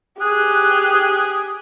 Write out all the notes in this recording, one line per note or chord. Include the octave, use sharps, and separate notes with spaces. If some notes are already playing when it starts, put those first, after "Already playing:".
G4 G#4 F#6